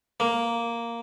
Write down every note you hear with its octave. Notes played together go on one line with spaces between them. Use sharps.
A#3